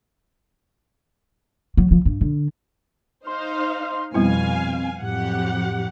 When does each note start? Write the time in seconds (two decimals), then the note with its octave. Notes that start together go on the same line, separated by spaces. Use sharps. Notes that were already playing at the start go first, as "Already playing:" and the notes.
1.77 F#3
1.91 F3
2.05 G2
2.21 D3
3.27 D#4 C5 F5 C6
4.14 F2 B2 G3 B3 C4 E4 F5 G#5
5.02 F2 A2 F#3 G4 F#5